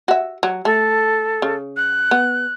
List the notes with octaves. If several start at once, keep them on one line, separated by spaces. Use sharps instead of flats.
F#4 E5
F#3
A3 A4
C#3
F#6
B3